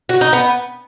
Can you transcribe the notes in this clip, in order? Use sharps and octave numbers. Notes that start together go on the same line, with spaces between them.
F#4
D#4
B3